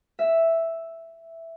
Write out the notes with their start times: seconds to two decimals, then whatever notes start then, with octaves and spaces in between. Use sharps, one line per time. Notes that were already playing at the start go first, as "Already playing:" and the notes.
0.19 E5